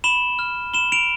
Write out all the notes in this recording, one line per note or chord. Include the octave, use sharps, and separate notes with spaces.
B5 E7 G7
F6
B5 E7 G7
D7 F7